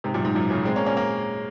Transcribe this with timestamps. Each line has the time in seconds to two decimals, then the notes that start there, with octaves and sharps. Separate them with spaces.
0.04 G#2 C3
0.14 F#2 A#2
0.25 G#2
0.35 F#2 A#2
0.50 A#2 C#3
0.65 G#3 C4
0.76 A#3 C#4
0.86 A#3 C#4
0.97 A#3 C#4